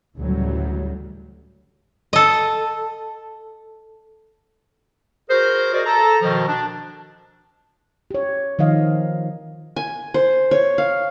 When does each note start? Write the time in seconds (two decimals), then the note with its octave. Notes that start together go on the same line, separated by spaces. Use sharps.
0.18 D2 A2 C#3 E3 F#3 G3
2.13 A4 D#5
5.30 F#4 G#4 A#4 C5
5.73 F#4 G#4 A#4 C5 D5 D#5
5.86 A4 A5 A#5
6.22 B2 D#3 F3
6.47 D4
8.11 G4 C#5
8.59 D#3 F3 D#5 F5
9.76 G#5
10.14 C5
10.51 C#5
10.78 F5